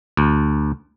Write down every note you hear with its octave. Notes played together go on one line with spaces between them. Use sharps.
D2